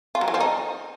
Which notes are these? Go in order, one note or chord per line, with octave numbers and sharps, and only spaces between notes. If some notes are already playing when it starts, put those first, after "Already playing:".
F4
F#3
E3
F3
D#4